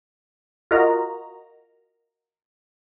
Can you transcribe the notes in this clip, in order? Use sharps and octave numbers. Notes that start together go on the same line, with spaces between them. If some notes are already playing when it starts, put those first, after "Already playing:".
F4 F#4 A#4 D#5 A#5